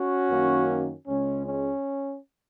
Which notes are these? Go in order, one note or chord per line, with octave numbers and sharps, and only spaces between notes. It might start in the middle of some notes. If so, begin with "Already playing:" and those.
Already playing: C#4 F#4
F#2 D#3 A#3
C#2 C#3 G#3 C#4
C#4